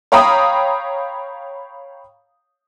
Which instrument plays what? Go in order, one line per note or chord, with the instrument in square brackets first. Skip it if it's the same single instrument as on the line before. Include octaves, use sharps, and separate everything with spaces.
[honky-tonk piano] C#5 F5 G5 A#5 B5 D#6